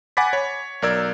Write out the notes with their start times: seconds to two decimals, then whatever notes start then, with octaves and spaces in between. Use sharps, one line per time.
0.17 F#5 G#5 B5 D6 A6 B6
0.33 C#5
0.82 B1 A#4 D5 E6 G#6